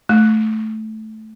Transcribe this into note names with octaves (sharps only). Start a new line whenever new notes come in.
A3